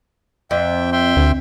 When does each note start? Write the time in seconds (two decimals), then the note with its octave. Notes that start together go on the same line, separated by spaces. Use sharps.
0.51 F2 E5 G5
0.92 E5 G5 C6
1.17 D2